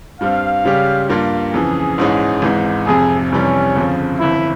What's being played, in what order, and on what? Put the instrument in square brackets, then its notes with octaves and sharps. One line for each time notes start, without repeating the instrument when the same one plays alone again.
[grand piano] G2 G3 C4 [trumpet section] F5
[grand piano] C#2 C#3 G3 C#4 G4
G2 G3 A#3 F4
[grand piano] F2 C#3 E3 [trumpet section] G#4
[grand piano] A#1 G#2 E3 G#3 C#4
G#1 G#2 E3 G#3
[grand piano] F1 F2 C3 [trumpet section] G#4
[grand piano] F1 F2 C3 E3 G3 [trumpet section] C#4
[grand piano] G1 F2 C#3 F3
[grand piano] G1 F2 E3 [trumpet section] E4